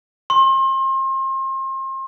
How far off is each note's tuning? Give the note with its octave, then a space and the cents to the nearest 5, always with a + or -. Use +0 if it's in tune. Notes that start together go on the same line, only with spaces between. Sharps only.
C6 +35